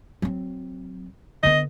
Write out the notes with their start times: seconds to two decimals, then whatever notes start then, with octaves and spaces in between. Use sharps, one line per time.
0.22 F#3 C4
1.43 D3 B3 D#5